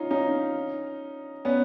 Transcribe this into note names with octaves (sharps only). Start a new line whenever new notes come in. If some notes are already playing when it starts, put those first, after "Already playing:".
Already playing: C#4 D#4 F4
C#4 D#4
B3 C#4